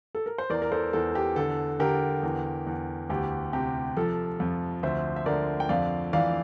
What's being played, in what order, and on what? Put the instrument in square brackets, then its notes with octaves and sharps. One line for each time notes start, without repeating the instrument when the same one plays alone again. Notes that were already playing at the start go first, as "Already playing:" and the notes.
[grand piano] A4
A#4
C5
E2 A#4 D5
A#4
A4 C5
E2 A4
G4
D3 A4
D3 G4 A#4
E2
E2
D2 G4
C3 G4
F3 A4
F2
D2 C5 E5
E5
D3 A#4 D5
G5
F2 D5 F5
E3 D5 F5